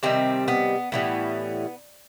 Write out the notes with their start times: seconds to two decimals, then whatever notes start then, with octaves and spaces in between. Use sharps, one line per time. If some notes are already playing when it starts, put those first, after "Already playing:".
0.03 C3 D#3 G3 C4
0.48 B3
0.92 A2 E3 G3 B3